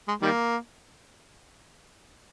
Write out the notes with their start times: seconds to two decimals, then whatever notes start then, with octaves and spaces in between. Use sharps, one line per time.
0.08 G#3
0.22 D#3 G3 A#3